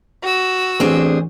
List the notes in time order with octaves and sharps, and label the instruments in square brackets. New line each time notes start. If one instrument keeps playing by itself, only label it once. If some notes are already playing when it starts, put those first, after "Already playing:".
[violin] F#4 E6
[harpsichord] A1 [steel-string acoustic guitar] C4 D4 G#4